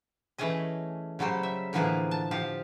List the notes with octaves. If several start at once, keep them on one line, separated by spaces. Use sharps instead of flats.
E3 A3 C#4 G#4 D#5
C#3 F#3 G3 C#4 C5
E5
A2 D3 E3 F3 A#3 G#4
A5
F3 G4 F5